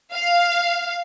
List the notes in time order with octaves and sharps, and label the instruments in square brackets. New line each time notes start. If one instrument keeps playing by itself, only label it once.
[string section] F5